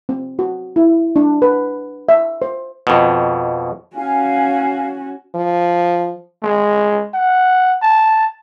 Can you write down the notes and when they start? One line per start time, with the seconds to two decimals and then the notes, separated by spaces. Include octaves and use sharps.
0.09 C4
0.39 F#4
0.76 E4
1.16 D4
1.42 B4
2.09 E5
2.42 C5
2.87 F2 B2
3.96 C#4 F#4 F5 G#5
5.35 F3
6.43 G#3
7.14 F#5
7.82 A5